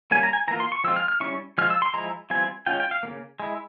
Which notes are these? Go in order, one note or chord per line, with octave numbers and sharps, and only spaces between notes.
G3 A#3 C#4 G#5
A#5
G#5
E3 A#3 F4 A#5
C6
C#6
F3 G#3 C4 F4 E6
F6
F6
G3 C#4 E4 C#6
F3 G#3 F4 F6
E6
C6
F3 G#3 E4 A#5
E3 G3 C4 F4 G#5
G#3 C#4 F4 G5
G5
F5
C#3 F3 A#3
G#3 E4